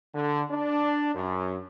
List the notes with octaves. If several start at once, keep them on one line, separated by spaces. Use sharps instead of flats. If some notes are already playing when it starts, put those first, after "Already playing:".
D3
D4
F#2